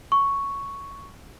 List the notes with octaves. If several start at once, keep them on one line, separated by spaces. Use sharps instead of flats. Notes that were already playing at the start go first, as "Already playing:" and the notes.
C#6